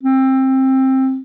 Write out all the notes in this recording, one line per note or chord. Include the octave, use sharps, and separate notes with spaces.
C4